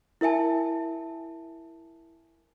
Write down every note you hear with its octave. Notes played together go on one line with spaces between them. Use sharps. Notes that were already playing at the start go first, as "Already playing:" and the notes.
E4 A#4 E5 G#5 A5